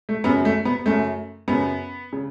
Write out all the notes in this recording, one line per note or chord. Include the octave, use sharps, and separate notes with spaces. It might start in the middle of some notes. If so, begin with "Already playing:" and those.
A3
F#2 C#3 B3
A3
B3
F#2 C#3 A3
F#2 C#3 B3
C#3